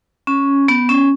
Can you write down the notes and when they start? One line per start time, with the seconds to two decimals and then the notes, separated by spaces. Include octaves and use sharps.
0.27 C#4
0.68 B3
0.89 C#4